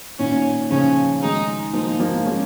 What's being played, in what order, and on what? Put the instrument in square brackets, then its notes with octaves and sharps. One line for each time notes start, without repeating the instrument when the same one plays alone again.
[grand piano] A#2 D#3 [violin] C#4
[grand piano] C#3 F3 [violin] C#4
[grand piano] D#3 G#3 [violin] D#4
[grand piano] F3 A#3 [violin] D#4
[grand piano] F3 A#3
G#3 C#4